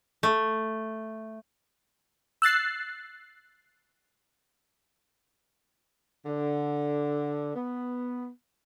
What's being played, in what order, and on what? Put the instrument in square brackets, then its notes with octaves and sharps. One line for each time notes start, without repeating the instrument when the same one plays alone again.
[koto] A3
[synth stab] E6 F#6 A6 C7
[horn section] D3
B3